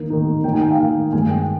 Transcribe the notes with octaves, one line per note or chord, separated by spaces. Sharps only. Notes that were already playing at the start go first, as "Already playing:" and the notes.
Already playing: D#3 A#3 D#4
D#3 A#3 D#4
D#3 A#3 D#4 G5
G#5
G5
F5
D#3 A#3 D#4
G2 D#3 G#3 G#5
G5